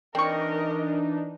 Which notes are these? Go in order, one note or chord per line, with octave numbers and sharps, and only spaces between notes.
E3 C4 D4 D#4 A#4 D#5 C#6